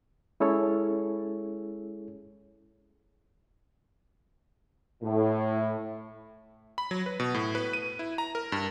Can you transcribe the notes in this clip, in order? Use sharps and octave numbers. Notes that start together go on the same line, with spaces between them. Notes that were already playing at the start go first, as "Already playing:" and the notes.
G#3 C#4 E4 G#4 A4 C#5
A2
B5
F#3
B4
B2
A2
B4
D#7
E4
A#5
A#4
G2